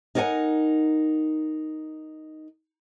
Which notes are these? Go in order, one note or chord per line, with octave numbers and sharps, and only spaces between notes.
D#4 A#4 C#5 D5 F#5 G#5